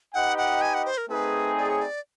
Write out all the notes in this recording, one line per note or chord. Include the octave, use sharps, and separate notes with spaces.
D#4 G4 B4 D#5 F#5 G5
F#5
G#5
F#5
C5
A#4
A3 C4 D#4 G#4 B4
D5
C#5
D5